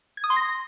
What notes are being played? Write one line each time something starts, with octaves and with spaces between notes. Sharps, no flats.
G#6
D#6
C6
A#6